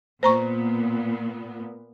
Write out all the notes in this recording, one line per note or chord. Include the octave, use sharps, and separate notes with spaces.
A#2 B3 C5 A#5 C#6